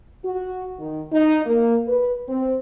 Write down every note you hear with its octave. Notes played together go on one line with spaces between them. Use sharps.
F#4
D#3
D#4
A#3
B4
C4